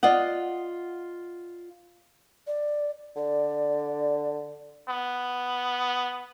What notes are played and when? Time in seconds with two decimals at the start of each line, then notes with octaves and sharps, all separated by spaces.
0.03 F4 D5 D#5 F#5
2.47 D5
3.17 D3 D5
4.88 B3